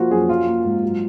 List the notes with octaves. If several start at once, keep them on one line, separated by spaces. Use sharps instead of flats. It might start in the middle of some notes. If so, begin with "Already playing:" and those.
Already playing: F3 A#3 F4 F#4
F#2 G#4
F#3 F4
A#3
G#2
F#3